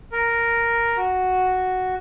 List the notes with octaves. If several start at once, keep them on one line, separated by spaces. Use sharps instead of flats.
A#4
F#4